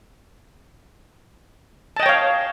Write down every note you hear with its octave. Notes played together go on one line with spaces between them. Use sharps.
C#5 D#5 F5 G5 A5